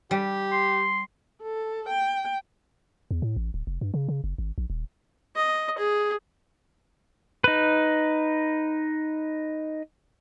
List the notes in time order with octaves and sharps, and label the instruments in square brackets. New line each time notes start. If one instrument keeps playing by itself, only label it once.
[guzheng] G3 [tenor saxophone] G4
[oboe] C6
[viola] A4
G5
[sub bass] E2
A2
A1
D1
F1
G2
C#3
C#3
F#1
G#1
A#1
D#1
[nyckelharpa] D#5
G#4
[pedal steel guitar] D#4 B4